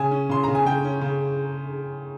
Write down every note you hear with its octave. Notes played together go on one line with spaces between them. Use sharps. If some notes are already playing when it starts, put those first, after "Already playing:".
Already playing: C#3 G#5
C#4
C#3 C6
C#3 A#5
G#5
C#3 G5
C#4
C#3